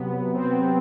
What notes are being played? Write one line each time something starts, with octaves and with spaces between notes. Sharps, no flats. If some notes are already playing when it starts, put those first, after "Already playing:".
Already playing: C3 F#3 B3
C4